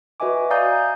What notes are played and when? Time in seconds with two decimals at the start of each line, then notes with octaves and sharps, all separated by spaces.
0.20 F#4 B4 D#5 E5 G#5 D6
0.50 D5 F5 G#5 A#5 D#6 G6